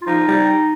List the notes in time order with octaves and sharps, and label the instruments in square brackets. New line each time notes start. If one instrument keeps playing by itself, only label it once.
[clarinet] F4
[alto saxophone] F3 [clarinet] D#4
[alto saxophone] G3